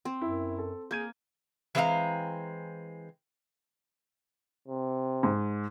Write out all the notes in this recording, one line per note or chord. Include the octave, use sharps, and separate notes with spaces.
C4
F#2 E4
A4
A#3 G#4 G6 G#6 D#7
E3 G#3 C4 E5 F5 A#5
C3
G#2